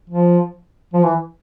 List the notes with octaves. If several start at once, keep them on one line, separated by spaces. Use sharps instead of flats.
F3
F3
E3